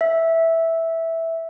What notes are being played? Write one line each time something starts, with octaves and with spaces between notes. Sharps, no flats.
E5